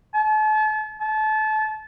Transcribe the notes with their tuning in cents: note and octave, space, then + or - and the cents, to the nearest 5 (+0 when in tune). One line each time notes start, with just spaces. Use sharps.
A5 -40
A5 -30